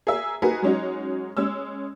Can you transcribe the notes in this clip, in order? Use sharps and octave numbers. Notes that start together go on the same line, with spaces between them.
G#4 A#4 E5
D#4 F#4 G#4 A#4 B4
F#3 G#3 C#4 D#4 F#4
G#3 C#4 E6